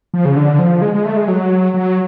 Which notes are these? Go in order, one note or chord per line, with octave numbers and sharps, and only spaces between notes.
F3
C#3
D3
F3
G#3
G#3
A3
G#3
F#3
F#3